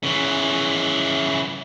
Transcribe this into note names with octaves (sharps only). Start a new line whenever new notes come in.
C#3 E3